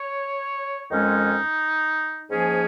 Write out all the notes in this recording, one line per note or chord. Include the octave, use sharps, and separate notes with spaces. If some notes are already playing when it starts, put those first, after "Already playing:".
Already playing: C#5
F2 D#3 G#3 C#4 D#4
G#2 F3 A#3 C#4 G#4